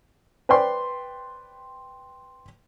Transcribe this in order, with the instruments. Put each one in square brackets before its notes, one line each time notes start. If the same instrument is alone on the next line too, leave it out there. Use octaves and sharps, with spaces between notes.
[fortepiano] B4 C5 D5 G5 C6